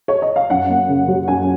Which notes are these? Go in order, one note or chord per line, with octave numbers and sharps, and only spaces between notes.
C#5
D#5
F5
F#2 F#5
A#3
C#3
F#3
F#2 G#5